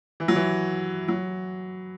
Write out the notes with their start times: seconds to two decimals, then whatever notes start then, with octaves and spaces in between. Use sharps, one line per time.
0.20 E3
0.28 F#3
0.35 E3
1.08 F#3